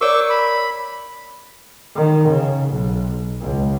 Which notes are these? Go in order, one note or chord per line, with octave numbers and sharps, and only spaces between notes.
A#4 C#5 D5 C#6 D6 E6
B5
D#3
C#3
B1
C#2